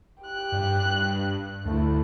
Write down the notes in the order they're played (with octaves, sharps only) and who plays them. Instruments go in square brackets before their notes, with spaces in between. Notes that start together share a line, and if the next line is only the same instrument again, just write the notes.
[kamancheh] G4 F#6
[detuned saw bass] G2
[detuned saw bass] D2 [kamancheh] A3 E4